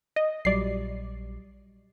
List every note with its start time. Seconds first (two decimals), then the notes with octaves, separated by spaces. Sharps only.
0.16 D#5
0.45 A#1 F#3 G3 D5 C7